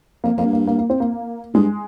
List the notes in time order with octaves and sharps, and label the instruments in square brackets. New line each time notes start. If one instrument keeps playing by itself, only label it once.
[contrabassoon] F2 [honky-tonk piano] A#3
[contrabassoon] F2 [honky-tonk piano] A#3
[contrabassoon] G2
[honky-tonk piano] A#3
A#3
A#3
C4
A#3
[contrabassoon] G2 [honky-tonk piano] G#3